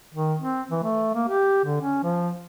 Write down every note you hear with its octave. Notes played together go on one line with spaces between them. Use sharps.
D#3
C4
E3
A3
A#3
G4
D3
C#4
F3